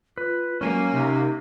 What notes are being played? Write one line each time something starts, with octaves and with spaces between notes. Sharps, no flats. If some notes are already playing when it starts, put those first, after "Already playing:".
F4 B4
F#3 A#3 C#4 G#5
C3 D#4